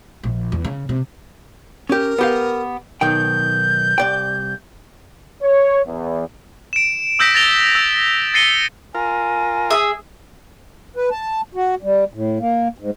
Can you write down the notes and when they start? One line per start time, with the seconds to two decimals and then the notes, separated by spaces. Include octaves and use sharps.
0.23 A#1
0.52 E2
0.65 C#3
0.89 C3
1.89 C#4 G4 A#4
2.18 B3 G4 F5
3.01 B1 D#3 G5 G6
3.98 C2 D5 G5
5.42 C#5
5.86 E2
6.73 D7 E7
7.19 D#6 E6 G6 A#6 B6 D7
7.35 A6 A#6 D7 F7 G7
7.75 E6
8.34 A6 A#6 C7 C#7 D#7 G7
8.95 F4 A#4 G#5
9.70 G#4 E5 D#6
10.96 B4
11.11 A5
11.55 F#4
11.82 G3
12.14 A2
12.39 A#3
12.78 G#2